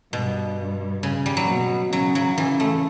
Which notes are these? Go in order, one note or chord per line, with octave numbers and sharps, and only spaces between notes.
G2 B2
C#3
G3
F#3
B2
C#3 F#3
F#3
C#3 E3
A3